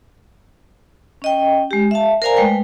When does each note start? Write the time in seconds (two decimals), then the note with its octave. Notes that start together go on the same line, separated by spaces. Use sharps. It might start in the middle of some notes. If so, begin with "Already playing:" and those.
1.22 C#4 D#5 G5
1.71 G#3 G4
1.91 E5 F5 A5
2.22 A#4 C5 D5 F5 G#5 A#5
2.37 G#3 A3 B4 G5